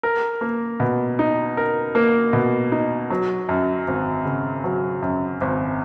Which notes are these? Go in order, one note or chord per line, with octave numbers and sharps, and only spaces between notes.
A#4
A#3
B2
D#4
A#4
A#3
B2
D#4
F#3
F#2
G#1
C#3
F#3
F#2
G#1